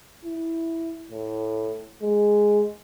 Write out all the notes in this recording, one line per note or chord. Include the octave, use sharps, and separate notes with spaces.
E4
A2
G#3